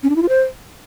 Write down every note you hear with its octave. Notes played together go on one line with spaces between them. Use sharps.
C#4
D4
E4
F4
C5